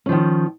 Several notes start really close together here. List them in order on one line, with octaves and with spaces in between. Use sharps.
C#4 F3 D#3